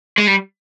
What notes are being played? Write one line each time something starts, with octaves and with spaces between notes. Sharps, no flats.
G#3
G3